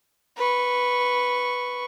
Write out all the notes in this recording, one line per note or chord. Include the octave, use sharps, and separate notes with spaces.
B4 C#6